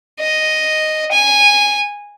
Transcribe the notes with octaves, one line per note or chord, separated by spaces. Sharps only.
D#5
G#5